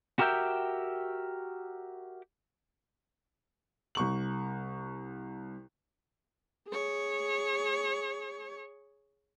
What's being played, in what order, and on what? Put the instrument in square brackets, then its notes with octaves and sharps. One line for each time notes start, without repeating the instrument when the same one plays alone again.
[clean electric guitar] F#4 G4 A#4 E5 G5
[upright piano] C2 C#6 F#7
[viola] G#4 C#5